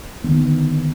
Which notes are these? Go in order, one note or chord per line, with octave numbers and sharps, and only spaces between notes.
D3 D#3 B3